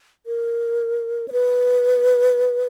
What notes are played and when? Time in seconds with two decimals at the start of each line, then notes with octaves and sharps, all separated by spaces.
0.26 A#4
1.28 C#5
1.32 B4